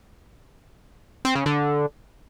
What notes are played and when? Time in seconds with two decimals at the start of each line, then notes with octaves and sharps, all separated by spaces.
1.25 C4
1.35 C#3
1.46 D3